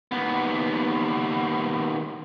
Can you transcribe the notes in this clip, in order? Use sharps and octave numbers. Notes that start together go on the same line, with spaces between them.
D#2 B3